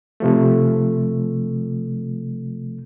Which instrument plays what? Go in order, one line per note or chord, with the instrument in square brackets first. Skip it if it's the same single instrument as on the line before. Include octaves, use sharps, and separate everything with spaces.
[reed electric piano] C3 F3 A3